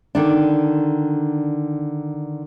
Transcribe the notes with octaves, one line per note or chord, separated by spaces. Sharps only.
D3 D#3 D4